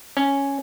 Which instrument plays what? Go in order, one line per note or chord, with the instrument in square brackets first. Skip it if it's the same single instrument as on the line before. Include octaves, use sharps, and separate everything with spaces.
[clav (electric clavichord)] C#4